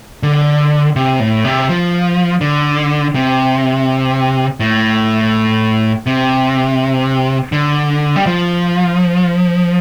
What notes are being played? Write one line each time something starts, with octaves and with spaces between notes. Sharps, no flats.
D3
C3
A2
C3
F3
D3
C3
A2
C3
D3
G3
F3